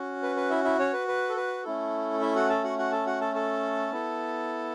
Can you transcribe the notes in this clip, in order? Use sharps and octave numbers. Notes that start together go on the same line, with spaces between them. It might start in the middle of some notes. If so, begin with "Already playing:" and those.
Already playing: C#4 F#4
B4
B4
E4 E5
E4 E5
C#4 C#5
B4
B4
A4
B4
A3 C#4 E4 A4
E4 E5
F#4 F#5
A4 A5
F#4 F#5
F#4 F#5
A4 A5
F#4 F#5
A4 A5
A4 A5
B3 E4 A4